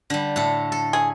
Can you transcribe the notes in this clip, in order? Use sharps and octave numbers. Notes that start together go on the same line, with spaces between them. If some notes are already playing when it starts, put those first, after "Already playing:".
D3 G3
A2 A4
A4
G#4